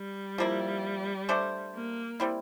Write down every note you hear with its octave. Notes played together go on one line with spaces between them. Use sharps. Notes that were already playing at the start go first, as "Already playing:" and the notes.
Already playing: G3
F3 A#3 E4
A3 D4 A4 C5
A#3
G3 C4 E4